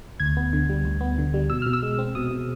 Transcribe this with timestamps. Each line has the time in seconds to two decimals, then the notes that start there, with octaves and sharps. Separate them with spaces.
0.20 D2 G#6
0.37 B3
0.53 D3
0.69 G3
0.85 D2
1.01 B3
1.18 D3
1.34 G3
1.50 B2 E6
1.62 B2 F6
1.73 E6
1.83 G#3
1.99 C4
2.15 B2 D#6
2.31 B2